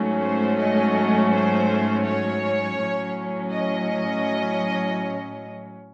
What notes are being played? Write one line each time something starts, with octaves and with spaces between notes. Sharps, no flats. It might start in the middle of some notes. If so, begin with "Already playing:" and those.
Already playing: G#2 F#3 A3 C#4
C5
D#5
C5
C#5
A2 F#3 C#4
D#5